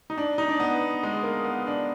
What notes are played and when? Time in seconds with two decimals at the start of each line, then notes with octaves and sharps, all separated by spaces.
0.10 D#4
0.17 D4
0.38 D#4
0.49 D4
0.60 B3
1.03 G#3
1.23 A#3
1.44 B3
1.67 D4